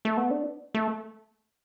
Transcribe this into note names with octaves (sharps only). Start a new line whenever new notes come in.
A3
B3
D4
A3